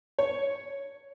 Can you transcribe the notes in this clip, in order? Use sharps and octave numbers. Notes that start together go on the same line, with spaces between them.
C#5